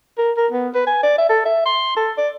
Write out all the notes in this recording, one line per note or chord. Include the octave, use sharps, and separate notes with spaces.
A#4
A#4
B3
B4
G#5
D5
E5
A4
E5
C6
A4
D5